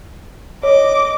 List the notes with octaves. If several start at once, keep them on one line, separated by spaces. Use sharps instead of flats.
C#5 D#5 D6